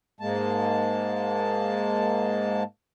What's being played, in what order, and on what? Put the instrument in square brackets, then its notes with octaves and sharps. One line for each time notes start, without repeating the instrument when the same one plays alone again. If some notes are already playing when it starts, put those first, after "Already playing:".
[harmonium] G#2 G#3 A#3 A5